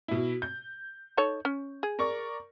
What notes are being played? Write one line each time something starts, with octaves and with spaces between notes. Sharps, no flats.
B2 E4
G6
D#4 A4 C#5
C#4
G#4
A#4 D5 C#6